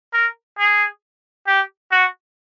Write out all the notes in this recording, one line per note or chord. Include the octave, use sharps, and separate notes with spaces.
A#4
G#4
G4
F#4